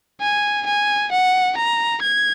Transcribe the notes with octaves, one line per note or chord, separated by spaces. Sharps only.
G#5
G#5
F#5
A#5
G#6